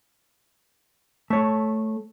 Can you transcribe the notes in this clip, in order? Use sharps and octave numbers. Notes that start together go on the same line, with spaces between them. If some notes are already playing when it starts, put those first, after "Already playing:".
A3 C#5